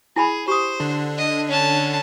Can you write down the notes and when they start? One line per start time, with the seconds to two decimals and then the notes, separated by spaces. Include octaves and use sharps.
0.16 E4 G#4 G#5 B5
0.48 G4 C5 D#6
0.80 D3 D4
1.18 D#5
1.48 C#4 A5